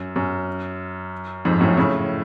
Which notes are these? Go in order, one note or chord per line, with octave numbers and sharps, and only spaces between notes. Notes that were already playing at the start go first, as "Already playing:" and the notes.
Already playing: F#2
F#2
F2 G#2
F#2 A2
A2 C#3